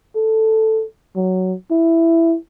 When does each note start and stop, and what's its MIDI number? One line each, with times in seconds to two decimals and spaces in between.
0.16 0.83 69
1.16 1.54 54
1.71 2.36 64